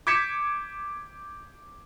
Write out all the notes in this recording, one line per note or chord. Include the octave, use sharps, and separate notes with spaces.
D6 G6 G#6 B6 C#7 E7